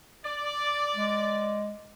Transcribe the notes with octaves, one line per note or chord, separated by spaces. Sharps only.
D5
G#3